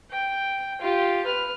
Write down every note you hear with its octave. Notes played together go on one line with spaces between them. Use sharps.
G5
F4 G4
B4 F6